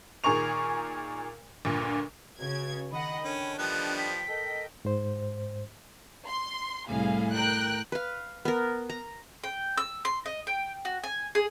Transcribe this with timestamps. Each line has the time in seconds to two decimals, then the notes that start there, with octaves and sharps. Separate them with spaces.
0.24 A#2 D#3 G#4 A#4 C#6 F7
1.65 D2 G2 A#2
2.39 C#2 C#3 F#4 G#6
2.92 D#3 D#5 F#5 B5
3.24 D3 D#3 C#4 D4 G5
3.58 F3 G3 B3 F#6
3.98 B6
4.28 A4 A#4 D#5
4.85 G#2 C5
6.27 C6
6.88 C2 A2 G#4 F5
7.33 A#4 G5 F#6
7.92 B4 F5
8.45 B3 A#4
8.90 A#5
9.44 G5
9.78 E6
10.05 C6
10.26 D#5
10.47 G5
10.85 F#4
11.04 G#5
11.35 G#4